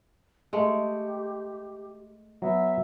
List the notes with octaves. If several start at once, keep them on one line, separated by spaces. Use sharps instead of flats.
G#3 A3 G4
F#3 B3 E5